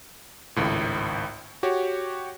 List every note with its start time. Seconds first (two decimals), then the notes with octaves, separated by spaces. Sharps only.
0.56 G#1 C#2 A2
1.63 F#4 G4 C#5